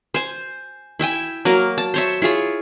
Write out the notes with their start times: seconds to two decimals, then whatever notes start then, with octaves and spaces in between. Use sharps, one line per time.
0.14 C5 G#5
0.99 E4 E5 G5 G#5
1.45 F#3 A#3 A#4 F5
1.78 A5
1.94 C5 C#5 E5
2.22 E4 F4 G#4 C#5